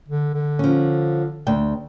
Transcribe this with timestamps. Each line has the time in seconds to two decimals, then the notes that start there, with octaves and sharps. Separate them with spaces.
0.08 D3
0.34 D3
0.59 F3 C#4
1.47 D2 G5